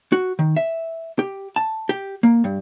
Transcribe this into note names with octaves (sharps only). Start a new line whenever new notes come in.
F#4
D#3
E5
G4
A5
G4
A#3
G2